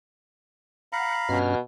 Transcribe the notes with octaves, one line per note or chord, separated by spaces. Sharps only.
F5 F#5 A#5 B5
G2 B2 C#4 F6